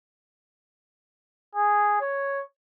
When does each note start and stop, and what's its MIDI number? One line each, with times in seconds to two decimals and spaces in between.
1.55 2.01 68
2.01 2.43 73